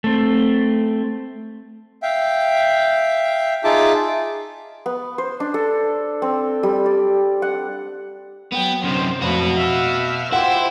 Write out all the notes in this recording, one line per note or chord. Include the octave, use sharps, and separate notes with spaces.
A3 C4
E5 F5 G5
D#4 F4 G#4 E5 A5 D6
B3
C5
D4
A4
C4
G3
D5
F#5
F#3 B3 G5
F#2 C3 C5
F2 A2 F#3 F#4 B4
E5 F5
E4 F4 G4 C5 F#5